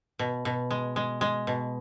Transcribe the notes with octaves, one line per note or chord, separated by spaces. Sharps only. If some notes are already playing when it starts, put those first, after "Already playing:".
B2
B2
G#3
G#3
G#3
B2